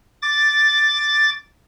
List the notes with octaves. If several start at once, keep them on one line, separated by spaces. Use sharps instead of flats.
D6 A6